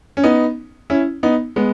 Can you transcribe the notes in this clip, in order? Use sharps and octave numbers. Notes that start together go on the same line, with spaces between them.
C#4
B3 D#4
C#4 E4
B3 D#4
G#3 B3